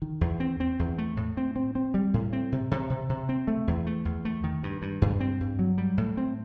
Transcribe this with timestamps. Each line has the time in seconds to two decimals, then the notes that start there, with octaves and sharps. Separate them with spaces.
0.02 D#3
0.21 E2
0.40 C4
0.60 C4
0.79 E2
0.98 A3
1.17 A2
1.37 C4
1.56 C4
1.75 C4
1.94 G3
2.14 A2
2.33 C4
2.52 C3
2.71 C3
2.90 C3
3.09 C3
3.29 C4
3.47 A3
3.67 E2
3.87 A3
4.05 E2
4.25 A3
4.44 D#3
4.63 G2
4.82 G2
5.02 G2
5.20 C4
5.41 G2
5.59 F#3
5.78 G3
5.98 A2
6.17 C4